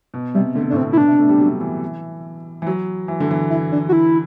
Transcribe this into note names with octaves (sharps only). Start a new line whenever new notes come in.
B2
C3 G3
D3 A3
A2 D4
B2 C4
E4
B2 D4
C3
A3
G3
F#3
E3
E3
F#3
E3
D3
E3
E4
D4
F#4
E4